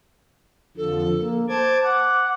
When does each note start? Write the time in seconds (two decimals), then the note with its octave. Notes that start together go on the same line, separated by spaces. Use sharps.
0.77 F2 D3 F3 A4
1.19 A#3
1.49 C5 A5 D6 G#6
1.83 F#5 D6